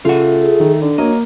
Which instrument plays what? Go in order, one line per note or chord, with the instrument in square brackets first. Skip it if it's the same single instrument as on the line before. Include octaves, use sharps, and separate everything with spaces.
[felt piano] C#3 [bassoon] A3 [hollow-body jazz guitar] F4 F#5
[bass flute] G#4
[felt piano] D#3
[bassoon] D3 [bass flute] D4
[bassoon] F#3 [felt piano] A#3 [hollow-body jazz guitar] D#5